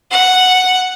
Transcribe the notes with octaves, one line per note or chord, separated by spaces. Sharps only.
F#5